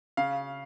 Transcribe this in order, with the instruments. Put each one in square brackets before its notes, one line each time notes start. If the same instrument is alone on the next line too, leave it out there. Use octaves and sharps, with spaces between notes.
[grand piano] C#3 F5